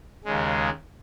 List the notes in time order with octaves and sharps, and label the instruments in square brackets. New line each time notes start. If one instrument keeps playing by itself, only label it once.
[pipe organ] D#2 C#3 G#3